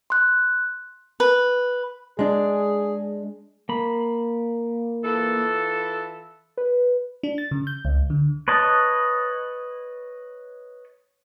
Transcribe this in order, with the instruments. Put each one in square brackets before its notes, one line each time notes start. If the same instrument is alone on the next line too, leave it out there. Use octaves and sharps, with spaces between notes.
[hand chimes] C6 F#6
[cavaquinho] B4
[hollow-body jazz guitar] G#3 D4 [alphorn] G#4
[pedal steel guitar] A#3 B5
[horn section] E3 F4 A4
[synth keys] B4
[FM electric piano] D4
A6
C#3
G6
C#2
D3
[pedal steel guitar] B4 C#5 D#5 A5